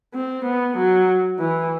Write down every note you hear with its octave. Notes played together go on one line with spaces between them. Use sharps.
C4
B3
F#3
E3